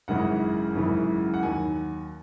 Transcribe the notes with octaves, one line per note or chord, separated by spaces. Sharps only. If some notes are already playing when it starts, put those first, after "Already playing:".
G#1 F#2 C#3 E3 G#3 F#5
G#1 F#2 C#3 E3 G#3
F#5
D#2 D#3 F#3 G#5